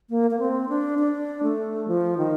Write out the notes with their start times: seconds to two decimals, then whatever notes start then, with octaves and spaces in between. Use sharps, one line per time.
0.10 A#3
0.31 A#3
0.39 C4
0.69 D4
0.99 D4
1.43 A3
1.88 F3
2.18 D#3